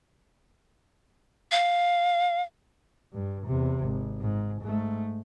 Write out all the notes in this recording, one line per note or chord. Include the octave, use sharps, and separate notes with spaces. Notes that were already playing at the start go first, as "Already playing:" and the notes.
F5
G2
E2 C3
G#1
G#2
G#2 A3